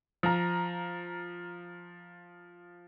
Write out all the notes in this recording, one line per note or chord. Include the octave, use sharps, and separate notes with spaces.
F3 A#5